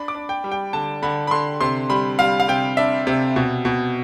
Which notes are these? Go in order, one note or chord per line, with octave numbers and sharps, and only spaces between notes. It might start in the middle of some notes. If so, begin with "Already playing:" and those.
Already playing: D4 B5
D6
D4
G5
G3
G5
D3 A5
D3 B5
B5
D3 C6
C3 C6
G3 B5
G3 F5
F5
C3 G5
D4 E5
C3
B2
B2